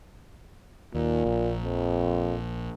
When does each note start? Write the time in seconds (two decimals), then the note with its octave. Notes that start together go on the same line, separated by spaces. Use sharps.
0.94 D#2 A#2
1.26 A#1
1.63 F2